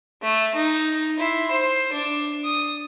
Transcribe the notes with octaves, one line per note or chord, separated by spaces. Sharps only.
A3
D#4
E4 C6
C5
D4
D#6